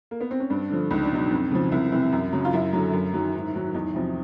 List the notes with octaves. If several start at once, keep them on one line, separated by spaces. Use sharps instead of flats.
A#3
B3
C4
C#4
G2 D4
D3 F3
C#2 D#4
D4
B2 F#3 D#4
F2
C#3 F3
C2 E4
C3 E3
F#2
C#3 F#3
F4
F#2 E4
D3 F#3
F#2
D#3 F#3
G#2
D#3 F#3
E2 D#4
C3 F3